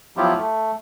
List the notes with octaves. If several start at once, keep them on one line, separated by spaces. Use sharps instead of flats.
F3 F#3 B3 E4 F4 G4
A3